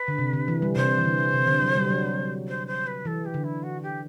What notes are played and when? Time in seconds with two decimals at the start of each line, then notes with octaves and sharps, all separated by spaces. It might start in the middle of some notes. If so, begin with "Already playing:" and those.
Already playing: B4
0.08 D3
0.18 C3
0.33 D3
0.48 E3
0.62 G3
0.76 C3 C5
0.99 E3
1.05 D3
1.33 C3
1.47 D3
1.62 F#3
1.76 G3
1.90 F#3
2.48 C5
2.67 C5
2.86 B4
3.05 E3 A4
3.25 G4
3.34 D3
3.43 E4
3.63 F#4
3.82 G4